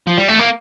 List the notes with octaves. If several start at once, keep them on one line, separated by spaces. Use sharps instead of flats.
F3
G3
A3
A#3